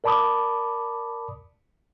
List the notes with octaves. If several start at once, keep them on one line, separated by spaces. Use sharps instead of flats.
A#4 D5 A5 B5 D6 D#6